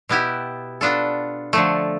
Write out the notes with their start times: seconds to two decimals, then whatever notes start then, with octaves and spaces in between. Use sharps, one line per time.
0.09 B2 B3 E4 G4
0.81 B3 D4 F4 A4
1.53 D3 F3 A3